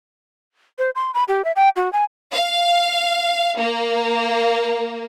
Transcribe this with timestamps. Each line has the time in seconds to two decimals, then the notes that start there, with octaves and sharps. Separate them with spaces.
0.79 C5
0.95 C6
1.14 B5
1.28 G4
1.45 E5
1.56 G5
1.76 F#4
1.93 G#5
2.33 F5
3.58 A#3